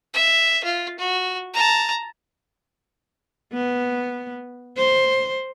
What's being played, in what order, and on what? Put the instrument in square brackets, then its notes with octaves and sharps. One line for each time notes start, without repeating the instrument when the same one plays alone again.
[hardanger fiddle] E5
F4
F#4
A5 A#5
[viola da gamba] B3
C5